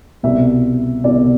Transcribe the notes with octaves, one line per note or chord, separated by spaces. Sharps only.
C2 B2 E5
C2 B2 D5